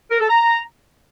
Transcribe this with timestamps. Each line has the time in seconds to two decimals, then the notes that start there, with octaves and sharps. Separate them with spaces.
0.11 A#4
0.20 A4
0.30 A#5